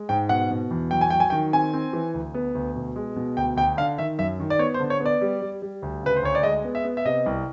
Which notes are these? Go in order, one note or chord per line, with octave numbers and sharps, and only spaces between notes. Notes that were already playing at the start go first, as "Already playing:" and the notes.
Already playing: G#3
G#2 G5
B2 F#5
B2
E2
F#3 G5
G#5
F#3 G5
G#5
D#3 G5
C4 G#5
C4
E3
D2
B3
D2
B2
G#3
B2
D2 G5
D2 G5
D3 F5
D#3 E5
F#2 E5
D#3
D5
B3 C#5
C5
D3
C#5
B3
D5
G3
G3
G3
D2
C#3 B4
C5
D2 C#5
D5
G#3 D#5
B3
E5
B3
E5
C3 D#5
C2